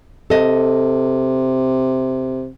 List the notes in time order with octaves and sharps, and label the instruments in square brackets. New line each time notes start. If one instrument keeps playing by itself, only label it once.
[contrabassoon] C3 [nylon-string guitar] A4 D#5